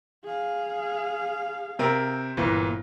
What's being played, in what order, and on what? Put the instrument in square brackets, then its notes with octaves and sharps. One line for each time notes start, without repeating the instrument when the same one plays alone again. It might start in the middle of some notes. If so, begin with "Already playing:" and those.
[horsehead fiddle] G#4 F5
[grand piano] C3 C4 A#4
G1 A#2 E3